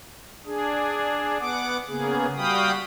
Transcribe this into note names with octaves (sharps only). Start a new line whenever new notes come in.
D4 G#4
B3 F#5 D6
C#3 A#3 B3 G#4
G3 F#4 F5 G5 B5 D#6